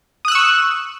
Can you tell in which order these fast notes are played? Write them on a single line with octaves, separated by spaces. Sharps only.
D#6 F#6 E6 C#6